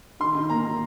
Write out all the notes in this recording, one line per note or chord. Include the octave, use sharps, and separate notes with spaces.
D#3 C6
D#3
A#3 A#5
A#3